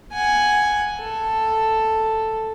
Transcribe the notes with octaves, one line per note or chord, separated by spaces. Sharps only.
F#5 G#5
A4